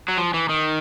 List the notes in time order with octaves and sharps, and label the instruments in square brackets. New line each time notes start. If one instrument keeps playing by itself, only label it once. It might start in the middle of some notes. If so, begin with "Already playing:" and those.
[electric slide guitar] F#3
F3
E3
D#3